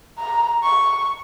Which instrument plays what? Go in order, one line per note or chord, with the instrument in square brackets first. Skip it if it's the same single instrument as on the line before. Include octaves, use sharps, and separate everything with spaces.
[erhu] A#5
C#6